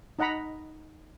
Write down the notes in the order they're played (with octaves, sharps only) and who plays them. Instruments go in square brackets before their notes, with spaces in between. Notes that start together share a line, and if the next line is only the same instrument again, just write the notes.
[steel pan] D#4 D#5 F#5 A#5 B5